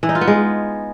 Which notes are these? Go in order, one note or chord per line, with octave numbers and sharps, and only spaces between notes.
E3
D#4
F4
B3
G#3